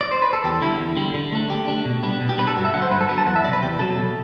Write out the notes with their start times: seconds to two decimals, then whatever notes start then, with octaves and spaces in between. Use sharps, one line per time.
0.01 D5
0.11 C5
0.22 B4
0.33 A4
0.44 E2 G4
0.62 D3 G3 E4
0.79 E2
0.97 D3 G3
1.14 D3
1.32 A3 D4
1.50 D3 G4
1.68 A3 D4
1.85 B2
2.03 G3 B3 D4
2.21 B2
2.29 G4
2.38 G3 B3 D4 B4
2.47 A4
2.56 G2 F#4
2.65 E5
2.74 D3 F#3 B3 F#5
2.82 C5
2.91 G2 B4
3.01 A4
3.09 D3 F#3 B3 B4
3.18 A5
3.26 E2 F#5
3.36 E5
3.44 F#3 D5
3.48 C3 B4
3.62 E2 G4
3.79 C3 F#3 A4
3.97 B2